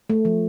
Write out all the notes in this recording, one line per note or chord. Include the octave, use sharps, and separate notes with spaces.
A3
F3